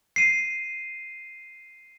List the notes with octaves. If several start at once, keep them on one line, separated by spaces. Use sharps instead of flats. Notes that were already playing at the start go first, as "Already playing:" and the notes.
C7 D#7